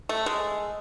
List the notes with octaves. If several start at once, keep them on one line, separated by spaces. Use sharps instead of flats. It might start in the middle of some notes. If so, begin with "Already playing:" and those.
A3
G#3